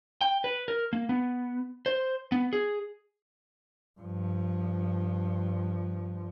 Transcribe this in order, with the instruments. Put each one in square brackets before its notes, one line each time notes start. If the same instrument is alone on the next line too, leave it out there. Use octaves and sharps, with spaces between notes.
[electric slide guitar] G5
B4
A#4
A#3
B3
C5
B3
G#4
[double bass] G2 F3